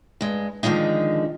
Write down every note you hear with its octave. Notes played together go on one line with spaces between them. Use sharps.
G2 G#3
D3 D#3 F3 G#3 D#4